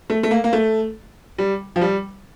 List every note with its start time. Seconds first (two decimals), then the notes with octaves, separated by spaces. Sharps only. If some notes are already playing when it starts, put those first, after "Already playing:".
0.10 A3
0.23 A3
0.31 A#3
0.44 A#3
0.53 A3
1.38 G3
1.76 F3
1.81 G3